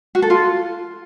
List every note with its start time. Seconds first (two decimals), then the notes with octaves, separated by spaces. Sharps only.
0.15 F#4
0.22 A4
0.30 F4